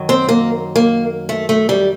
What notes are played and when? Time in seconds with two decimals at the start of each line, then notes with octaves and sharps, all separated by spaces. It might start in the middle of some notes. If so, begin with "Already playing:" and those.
Already playing: F#2 D#3 F#3
0.09 C4
0.29 A#3
0.76 A#3
1.29 A3
1.49 A3
1.69 G3